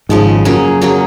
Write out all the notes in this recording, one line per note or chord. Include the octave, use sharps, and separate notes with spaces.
G#1 G#2 C#3 F3 G#3
F#2 F#3 A#3 C#4 G#4
F#3 A#3 C#4 G#4